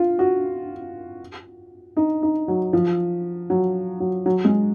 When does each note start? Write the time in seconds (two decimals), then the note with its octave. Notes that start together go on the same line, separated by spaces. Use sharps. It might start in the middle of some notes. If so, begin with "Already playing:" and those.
Already playing: F4
0.19 F#4
1.97 D#4
2.23 D#4
2.48 F#3
2.73 F3
3.50 F#3
4.00 F#3
4.26 F#3
4.45 G#3